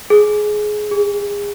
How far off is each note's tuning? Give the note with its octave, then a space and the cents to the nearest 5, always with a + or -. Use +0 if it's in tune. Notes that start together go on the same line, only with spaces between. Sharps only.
G#4 +20
G#4 -30